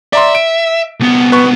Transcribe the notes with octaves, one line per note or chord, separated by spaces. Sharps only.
D5 E5 A#5 C6
D7
C2 B3
B4 C#6